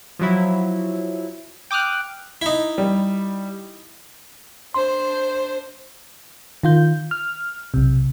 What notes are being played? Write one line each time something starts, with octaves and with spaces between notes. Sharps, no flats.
F3 F#3 E4
G5 D6 D#6 F6 F#6
D#4 E4
G3
D4 C5 C6
D#3 F4 G6
F6
B1 C3